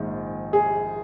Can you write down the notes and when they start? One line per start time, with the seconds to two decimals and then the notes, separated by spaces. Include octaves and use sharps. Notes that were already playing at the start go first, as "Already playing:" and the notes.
Already playing: A#1 G#2 D#3
0.53 G#4